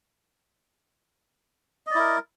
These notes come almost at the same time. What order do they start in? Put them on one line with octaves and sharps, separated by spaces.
D#5 D5 E4 A#4